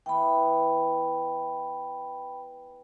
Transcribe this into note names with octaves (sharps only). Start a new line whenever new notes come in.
E3 B3 G5 B5